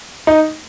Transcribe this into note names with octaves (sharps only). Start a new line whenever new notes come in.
D#4